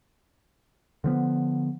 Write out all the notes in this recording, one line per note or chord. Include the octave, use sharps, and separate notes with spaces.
D3 F3 B3